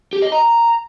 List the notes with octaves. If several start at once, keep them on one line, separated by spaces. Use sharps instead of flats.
G4
D#5
A#5